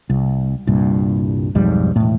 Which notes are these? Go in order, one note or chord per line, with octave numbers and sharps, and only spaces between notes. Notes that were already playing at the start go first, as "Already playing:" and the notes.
C2
C2 G2 A#2
B1 F2 G#2 G3
E1 A2